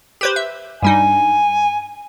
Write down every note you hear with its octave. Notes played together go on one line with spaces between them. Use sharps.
G4 B4 C5
E5
G2 G3 D#4 G#5